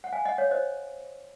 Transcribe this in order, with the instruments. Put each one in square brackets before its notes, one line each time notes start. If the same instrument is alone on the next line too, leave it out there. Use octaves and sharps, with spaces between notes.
[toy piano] F#5
F5 G#5
D#5 F#5
C#5 F5
C5 D#5